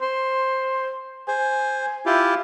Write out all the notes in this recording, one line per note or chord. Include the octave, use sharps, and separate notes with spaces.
C5
C5 G#5
E4 F4 G4